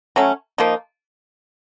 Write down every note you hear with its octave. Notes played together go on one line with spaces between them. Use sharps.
F#3 A3 C#4
F3 A#3 D#4